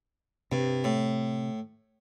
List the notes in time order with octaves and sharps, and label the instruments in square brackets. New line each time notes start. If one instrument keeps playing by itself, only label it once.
[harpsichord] G2 [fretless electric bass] C3
[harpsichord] A2